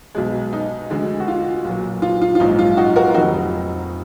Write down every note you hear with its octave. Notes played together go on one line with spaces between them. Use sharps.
B1 B2 G#3
D#4
D2 D3 G#3
F#4
F4
B1 A#2 F#3
F4
F4
F4
A#1 G#2 F#3 D#4
F4
D#4 F#4
F#4 A#4
F4
F1 F2 D#3 F#3 D#4 F#4
D#4